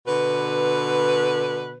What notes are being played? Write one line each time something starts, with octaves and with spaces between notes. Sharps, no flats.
B2 D3 B4